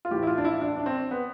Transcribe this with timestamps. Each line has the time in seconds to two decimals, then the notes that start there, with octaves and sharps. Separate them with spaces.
0.05 F4
0.11 A2 E3 G4
0.23 E4
0.27 F4
0.38 D4
0.44 E4
0.61 D4
0.76 D4
0.86 C4
1.11 B3